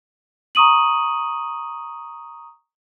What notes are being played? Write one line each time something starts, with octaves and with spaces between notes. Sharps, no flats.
A#5 C#6 D#6 D#7 F#7